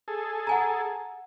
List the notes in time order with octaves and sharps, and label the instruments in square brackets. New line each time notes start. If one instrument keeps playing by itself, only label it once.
[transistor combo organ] G#4 A4
[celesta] F#5 G#5 A#5